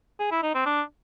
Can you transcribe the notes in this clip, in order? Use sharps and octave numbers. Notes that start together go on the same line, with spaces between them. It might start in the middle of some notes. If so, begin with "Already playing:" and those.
G#4
E4
D#4
C4
D4